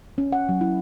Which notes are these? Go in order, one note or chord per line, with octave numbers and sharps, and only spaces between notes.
C#4
F#5
F#3
E4